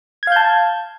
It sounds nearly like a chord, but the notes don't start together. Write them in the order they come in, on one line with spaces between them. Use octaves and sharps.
G#6 F5 G6 A5